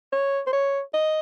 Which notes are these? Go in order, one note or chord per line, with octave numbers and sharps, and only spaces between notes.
C#5
C5
C#5
D#5